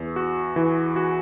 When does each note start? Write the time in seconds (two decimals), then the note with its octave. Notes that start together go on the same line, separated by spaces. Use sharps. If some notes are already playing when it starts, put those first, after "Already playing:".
Already playing: E2
0.16 F#4
0.56 E3
0.96 F#4